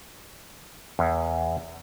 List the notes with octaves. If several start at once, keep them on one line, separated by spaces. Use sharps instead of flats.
E2